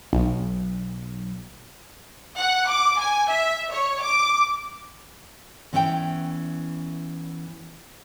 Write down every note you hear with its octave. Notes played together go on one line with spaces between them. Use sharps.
B1
F#5
D6
G#5
E5
C#5
D6
E2 E3 C#4 E4 E5 G5